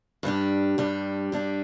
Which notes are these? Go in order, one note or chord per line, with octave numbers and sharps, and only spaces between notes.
G2 G3 D4 G4
G2 G3 D4 G4
G2 G3 D4 G4